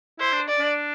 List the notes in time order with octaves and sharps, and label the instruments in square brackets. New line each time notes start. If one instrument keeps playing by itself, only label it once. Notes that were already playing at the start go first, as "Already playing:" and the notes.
[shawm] E4 [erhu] C5
[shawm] D4
[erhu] D5
[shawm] D4